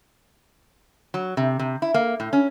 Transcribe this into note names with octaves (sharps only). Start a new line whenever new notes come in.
F#3
C3
C3
E4
A#3
A2
C#4